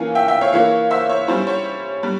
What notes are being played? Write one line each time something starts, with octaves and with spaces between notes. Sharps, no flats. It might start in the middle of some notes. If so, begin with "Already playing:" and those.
Already playing: E3 A#3 C#4 F4 F5 G#5
E5 G5
E5 G5
C#5 F5
E3 A#3 E4 C#5 F5
C5 E5
C#5
G3 C#4 E4 C5
C#5
G3